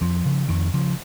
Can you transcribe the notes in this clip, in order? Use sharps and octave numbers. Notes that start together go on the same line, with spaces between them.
F2 F3
C#3
F2 D#3
C#3 F3